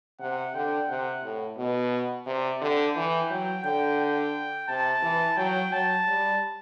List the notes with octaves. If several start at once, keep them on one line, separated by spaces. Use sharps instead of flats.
C3 F#5
D3 G5
C3 F#5
A2
B2
C3 D5
D3 G5
E3 G5
F#3 G5
D3 G5
G5
C3 A5
E3
F#3 G5
F#3 A5
G3